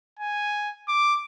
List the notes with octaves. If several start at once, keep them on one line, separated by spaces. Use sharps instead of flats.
G#5
D6